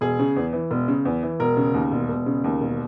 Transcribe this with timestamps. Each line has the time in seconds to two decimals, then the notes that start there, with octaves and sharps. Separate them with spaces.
0.01 E1 G#4
0.19 C#3
0.36 E2
0.53 E3
0.71 E1
0.88 C#3
1.05 E2
1.23 E3
1.40 E1 A#4
1.57 C#3
1.74 D#2
1.91 E1
2.09 E1
2.26 C#3
2.44 D#2
2.61 E1